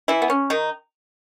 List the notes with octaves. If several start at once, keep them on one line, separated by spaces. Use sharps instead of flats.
E3 E4
B3
C#4
D#3 D#4